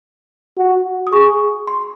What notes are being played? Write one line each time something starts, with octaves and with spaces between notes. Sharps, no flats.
F#4
D#6
G#4 C#6
C6